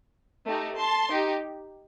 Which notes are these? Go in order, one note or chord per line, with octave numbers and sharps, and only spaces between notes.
A3 D#4 G4
A5 C6
D#4 G4